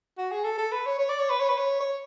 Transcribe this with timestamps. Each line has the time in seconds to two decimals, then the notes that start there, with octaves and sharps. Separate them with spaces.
0.18 F#4
0.32 G#4
0.44 A4
0.58 A4
0.72 B4
0.86 C#5
0.99 C#5
1.09 D5
1.19 C#5
1.29 B4
1.40 C#5
1.49 B4
1.58 C#5
1.80 C#5